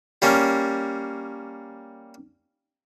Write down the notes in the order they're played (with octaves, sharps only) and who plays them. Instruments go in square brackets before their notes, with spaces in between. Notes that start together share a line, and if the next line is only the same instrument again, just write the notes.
[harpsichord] G3 A#3 C#4